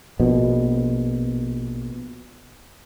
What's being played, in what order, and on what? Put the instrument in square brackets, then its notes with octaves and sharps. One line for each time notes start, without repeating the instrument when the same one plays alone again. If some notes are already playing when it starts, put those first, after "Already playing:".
[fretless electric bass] A#1 B2